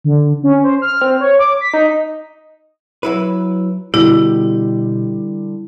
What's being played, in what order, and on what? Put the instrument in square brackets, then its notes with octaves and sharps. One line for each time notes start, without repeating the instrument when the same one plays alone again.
[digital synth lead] D3
C#4
C5
F6
C4
C#5
D6
B6
D#4
[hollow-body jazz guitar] F#3 E4 B4
[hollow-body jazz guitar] B2 G4 [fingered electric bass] D3 G3 [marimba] E4